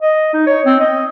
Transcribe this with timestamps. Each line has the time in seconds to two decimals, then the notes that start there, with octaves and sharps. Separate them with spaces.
0.02 D#5
0.34 D#4
0.47 C#5
0.65 C4
0.80 D#5